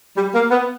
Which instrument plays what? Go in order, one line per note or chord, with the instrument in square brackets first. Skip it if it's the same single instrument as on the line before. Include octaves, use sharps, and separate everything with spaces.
[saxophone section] G3
A#3
B3